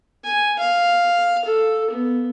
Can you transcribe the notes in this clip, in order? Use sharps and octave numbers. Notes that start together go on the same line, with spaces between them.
G#5
F5
A4
B3